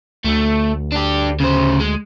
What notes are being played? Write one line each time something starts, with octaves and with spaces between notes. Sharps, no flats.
D2 A3
D4 G4
C#3 C5
G#3